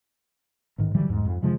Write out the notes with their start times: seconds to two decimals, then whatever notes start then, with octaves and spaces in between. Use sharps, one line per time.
0.78 A1 G#2 D#3
0.95 D3 E3 F#3 G3
1.09 E2 G#2
1.25 F2
1.42 C3 D#3 F3 G#3